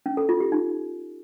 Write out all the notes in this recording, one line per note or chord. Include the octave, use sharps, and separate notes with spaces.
C#4
A4
F4
G4
D#4